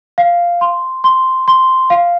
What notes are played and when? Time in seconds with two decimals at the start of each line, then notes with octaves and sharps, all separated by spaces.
0.18 F5
0.61 C6
1.04 C6
1.48 C6
1.90 F5